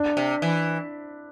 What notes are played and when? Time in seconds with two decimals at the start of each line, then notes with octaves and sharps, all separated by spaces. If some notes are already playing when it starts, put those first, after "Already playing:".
Already playing: D4
0.17 C3
0.42 E3